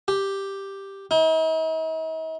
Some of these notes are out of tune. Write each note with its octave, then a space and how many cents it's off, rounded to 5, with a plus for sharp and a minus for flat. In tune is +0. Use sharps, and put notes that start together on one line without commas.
G4 +0
D#4 +45